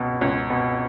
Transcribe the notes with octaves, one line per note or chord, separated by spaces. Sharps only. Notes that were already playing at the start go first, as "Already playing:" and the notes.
Already playing: C#2 B2
C#2
B2